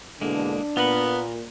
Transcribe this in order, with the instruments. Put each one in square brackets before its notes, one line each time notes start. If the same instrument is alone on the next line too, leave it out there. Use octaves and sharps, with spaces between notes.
[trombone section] E2 B2 D3 [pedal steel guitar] G#3 A#3 [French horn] D4
[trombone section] A#2 [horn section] B3 [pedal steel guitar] F4 A#4 B5